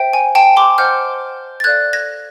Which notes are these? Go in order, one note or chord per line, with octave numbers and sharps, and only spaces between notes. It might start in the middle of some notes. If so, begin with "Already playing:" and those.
Already playing: C5 E5 G5
G#5
G5 A5
C6 D6
C5 D#5 F#5 F6 G6
A6
A4 D5 F5 F#6 G#6
G#6 A#6